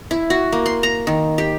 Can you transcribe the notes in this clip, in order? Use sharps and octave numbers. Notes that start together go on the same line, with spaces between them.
E4
F#4
A#3
C6
A#5
D#3
G4